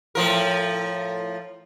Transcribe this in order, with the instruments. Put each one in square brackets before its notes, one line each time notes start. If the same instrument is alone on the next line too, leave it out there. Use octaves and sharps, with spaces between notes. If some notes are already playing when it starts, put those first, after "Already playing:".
[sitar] A2 F3 A#4